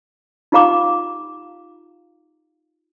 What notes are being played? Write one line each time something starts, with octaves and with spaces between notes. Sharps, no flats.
D#4 F4 G4 F5 A#5 D6